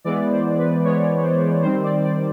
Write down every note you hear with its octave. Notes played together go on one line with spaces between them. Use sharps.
E3 G#3 B3 D5
C5
B4
E3 G#3 B3 C#5
C5
D#3 G3 C4 C5
D5
D5